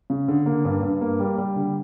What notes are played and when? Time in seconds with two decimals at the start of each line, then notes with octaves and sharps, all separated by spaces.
0.10 C#3
0.28 D3
0.46 A#3
0.65 G2
0.83 G2
1.01 A#3
1.20 G3
1.38 G3
1.56 D3